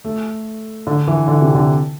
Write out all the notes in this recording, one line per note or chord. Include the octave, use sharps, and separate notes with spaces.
A3
D3
E3
D3
C3
D3